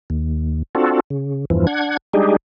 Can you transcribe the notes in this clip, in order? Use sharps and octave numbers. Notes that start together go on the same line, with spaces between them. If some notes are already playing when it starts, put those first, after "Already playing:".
D#2
C4 D4 F4 F#4 A4
C#3
E2 G2 E3 F3
D4 F#5 G#6
G3 G#3 D4 D#4 G4 G#4